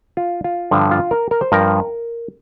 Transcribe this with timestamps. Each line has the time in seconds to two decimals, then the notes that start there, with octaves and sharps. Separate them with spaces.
0.17 F4
0.44 F4
0.71 G2 D3 F3
0.91 F4
1.11 A#4
1.31 A#4
1.41 C5
1.52 G2 F3 A#4